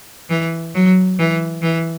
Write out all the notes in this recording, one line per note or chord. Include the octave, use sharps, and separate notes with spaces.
E3
F#3
E3
E3